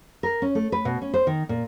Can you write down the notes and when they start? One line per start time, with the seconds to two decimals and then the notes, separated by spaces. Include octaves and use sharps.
0.23 A#4
0.42 C#4
0.55 A3
0.72 B4
0.85 B2
1.02 C#4
1.14 C5
1.27 D#3
1.49 A#2